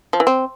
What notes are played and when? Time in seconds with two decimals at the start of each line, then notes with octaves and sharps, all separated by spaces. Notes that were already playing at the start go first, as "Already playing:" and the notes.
0.13 F3
0.20 E3
0.27 C4